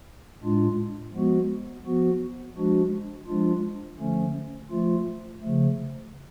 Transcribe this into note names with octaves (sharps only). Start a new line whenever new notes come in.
A2 G#3 D4 F4
F3 G#3 B3 F#4
F3 B3 F#4
F3 G#3 D4 F#4
F3 G#3 D4 F4
D3 F3 A3 C#4
F3 A3 F4
C#3 F3 A3